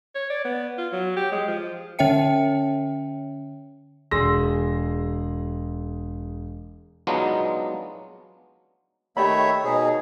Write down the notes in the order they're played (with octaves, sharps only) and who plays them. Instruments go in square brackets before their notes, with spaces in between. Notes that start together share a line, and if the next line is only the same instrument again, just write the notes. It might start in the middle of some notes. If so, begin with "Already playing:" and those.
[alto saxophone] C#5
D5
B3
F4
F#3
G4
G#3
F3
[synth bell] D3 C#4 C#5 E5 G5 C#7
[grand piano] E1 G#4 C6 E6 A#6
[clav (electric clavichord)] F#3 G#3 B3 D4 D#4 F4
[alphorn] D#3 [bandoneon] A3 C#5 E5 [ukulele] G4 D5 B5
[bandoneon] B2 G#4 [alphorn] D#4 [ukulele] C#5